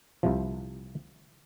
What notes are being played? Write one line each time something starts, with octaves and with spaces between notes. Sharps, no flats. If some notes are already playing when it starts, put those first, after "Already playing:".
C2 C3 F3